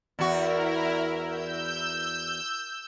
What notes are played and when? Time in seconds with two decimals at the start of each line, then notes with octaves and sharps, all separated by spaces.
0.19 E2 E4 F#4 A#4
1.24 E6 G6